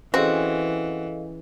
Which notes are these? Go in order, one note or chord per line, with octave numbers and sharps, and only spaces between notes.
E3 C4 C#4 F#4 G#4 A4 D#5 F5